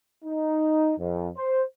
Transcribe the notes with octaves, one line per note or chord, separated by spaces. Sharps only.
D#4
F2
C5